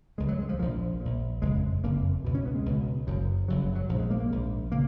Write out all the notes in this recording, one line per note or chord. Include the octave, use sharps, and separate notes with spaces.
C#2 C#3 G#3
F#3
G#3
F3
A#1 A#2 F3
A#1 A#2
F#1 F2 C#3 G#3
F#1 F2 C#3 A#3
C#2 B2
C#4
B3
G#3
C#2 B2
F#1 F#2 C#3
F#1 F#2 C#3 F#3
F#3
F#3
A#1 G#2 F3
G#3
A#3
A#3
A#1 G#2
C#3 A#3